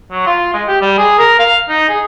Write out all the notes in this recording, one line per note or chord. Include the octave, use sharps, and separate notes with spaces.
F#3
F4
G#3
G4
G3
G#4
A#4
F5
D#4
G#4